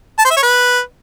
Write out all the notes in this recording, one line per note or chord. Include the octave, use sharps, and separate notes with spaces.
A5
C5
E5
C#5
B4